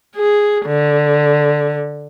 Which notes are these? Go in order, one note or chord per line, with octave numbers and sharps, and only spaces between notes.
G#4
D3